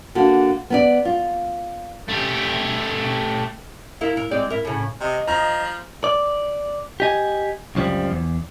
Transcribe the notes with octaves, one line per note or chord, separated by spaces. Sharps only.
D3 A#3 F#4
B3 A#4 D5
F4
A3 G4
E4 F4 A#4
A#4
G#3 C4 D5
E4 A#4
A2 C#3
C3 D#5
F3 A#5
D5
G4 D#5 G#5
C#2 F#2 F3 G3 C4
E2